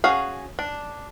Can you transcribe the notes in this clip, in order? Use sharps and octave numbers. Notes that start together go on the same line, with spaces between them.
C#4 F#4 G#4 F5
D4